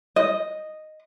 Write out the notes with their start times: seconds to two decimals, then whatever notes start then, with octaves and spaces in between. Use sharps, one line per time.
0.16 D#5